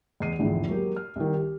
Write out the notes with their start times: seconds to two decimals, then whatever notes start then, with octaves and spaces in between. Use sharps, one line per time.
0.20 E2 D#5 C7 D#7
0.39 A#1 E2 G#2 D3 E3 F3
0.68 F#3 G#3 A#3 G4
0.96 F6
1.16 C2 D#3
1.34 G4